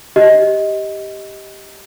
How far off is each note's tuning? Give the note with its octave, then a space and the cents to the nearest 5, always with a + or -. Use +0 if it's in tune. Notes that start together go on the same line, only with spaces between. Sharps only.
G4 +0 D#5 +15